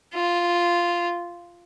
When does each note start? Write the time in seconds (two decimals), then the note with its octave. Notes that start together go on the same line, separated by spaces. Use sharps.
0.14 F4